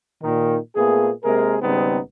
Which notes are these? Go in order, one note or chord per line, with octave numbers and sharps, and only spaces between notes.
A#2 D#3
A#2 A3 B3 G#4
C3 G#3 A#3 G#4 A#4
G#1 C#3 G3 B3 C4 D#4